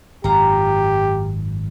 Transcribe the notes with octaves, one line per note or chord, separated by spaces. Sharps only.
G#1 F#2 F4 G4 A#5